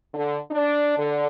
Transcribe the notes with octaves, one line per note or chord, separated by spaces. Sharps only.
D3
D4
D3